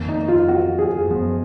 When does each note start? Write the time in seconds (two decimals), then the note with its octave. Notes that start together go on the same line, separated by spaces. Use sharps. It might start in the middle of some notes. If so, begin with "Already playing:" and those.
Already playing: F2 D#3 A#3
0.09 D#4
0.28 F4
0.48 F#4
0.79 G#4
1.08 F#2 F3 B3